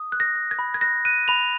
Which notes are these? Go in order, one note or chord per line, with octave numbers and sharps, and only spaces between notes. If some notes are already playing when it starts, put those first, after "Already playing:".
Already playing: D#6
F#6
A#6
F#6
G#6
B5
G#6
F#6 A#6
F#6 D#7
B5 F7